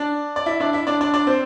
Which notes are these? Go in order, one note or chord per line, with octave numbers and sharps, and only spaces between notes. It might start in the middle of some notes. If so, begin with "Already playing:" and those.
Already playing: D4 D5
D5
E4 E5
D4 D5
E4 E5
D4 D5
D4 D5
D4 D5
C4 C5